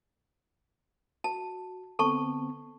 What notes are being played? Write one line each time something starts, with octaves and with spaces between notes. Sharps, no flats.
F#4 A5
D3 B3 C4 A4 A5 C#6